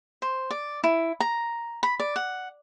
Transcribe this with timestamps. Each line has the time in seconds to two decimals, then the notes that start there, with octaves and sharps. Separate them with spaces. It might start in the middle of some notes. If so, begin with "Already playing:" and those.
0.22 C5
0.51 D5
0.84 E4
1.20 A#5
1.83 B5
2.00 D5
2.16 F#5